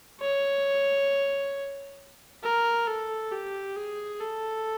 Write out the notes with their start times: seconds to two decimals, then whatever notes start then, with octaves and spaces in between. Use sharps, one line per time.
0.21 C#5
2.43 A#4
2.87 A4
3.32 G4
3.76 G#4
4.20 A4